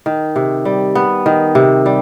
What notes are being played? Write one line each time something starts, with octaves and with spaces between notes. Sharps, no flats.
D#3
C3
G3
B3
D#3
C3
G3